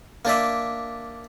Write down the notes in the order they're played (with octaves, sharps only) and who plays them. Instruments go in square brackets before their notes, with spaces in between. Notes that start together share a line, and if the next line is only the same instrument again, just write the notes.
[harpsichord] A#3 D4 D5 E5